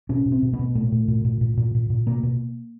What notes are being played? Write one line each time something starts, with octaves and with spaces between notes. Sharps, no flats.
B2 C#4
B2
C4
B2
B3
B2
A#2 A3
A#2
A#2
A#2
A#2
A#2
A#2
A#2
B2 A#3
B2